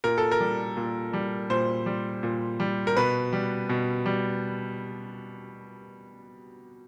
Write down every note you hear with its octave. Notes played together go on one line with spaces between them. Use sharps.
A#2 A#4
A4
A#4
G3
A#2
G3
A#2 C5
G3
A#2
G3
A#4
B2 B4
G3
B2
G3